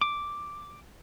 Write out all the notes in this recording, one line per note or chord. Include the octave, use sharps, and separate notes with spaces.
D6